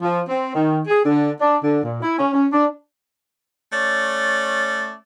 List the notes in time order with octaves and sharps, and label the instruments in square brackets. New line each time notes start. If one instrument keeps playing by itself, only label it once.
[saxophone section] F3
C4
D#3
G#4
D3
D4
D3
A#2
E4
C#4
C#4
D4
A3 C#4 D5